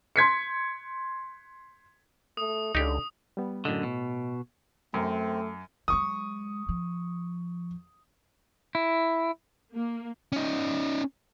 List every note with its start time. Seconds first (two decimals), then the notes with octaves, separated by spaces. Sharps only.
0.16 C6 G#6 B6 C#7
2.37 A3 D#6
2.75 C#2 D3 D#4 G4
3.37 G3 B3
3.65 F#2 A2 D3 D#5
3.83 B2
4.94 F#2 A3 C4
5.88 F#3 G#3 C#6 D#6
6.69 F3
8.75 E4
9.74 A#3
10.32 C#4 D#4